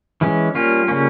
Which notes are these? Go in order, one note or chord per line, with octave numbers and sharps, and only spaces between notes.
E3 G#3 C#4
G3 A#3 C#4 F4
C#3 G3 A#3 C#4